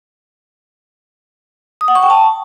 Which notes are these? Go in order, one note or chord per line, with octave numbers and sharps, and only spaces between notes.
D#6
F#5
C#6
G5
A5